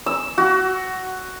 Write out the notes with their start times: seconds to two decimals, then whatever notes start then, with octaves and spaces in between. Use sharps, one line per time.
0.06 E6
0.38 F#4